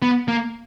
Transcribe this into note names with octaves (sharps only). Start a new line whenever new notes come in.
B3
A#3